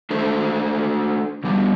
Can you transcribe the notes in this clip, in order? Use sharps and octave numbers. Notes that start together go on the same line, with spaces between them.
A3 D4 A4 C5
B2 G3 B3 D4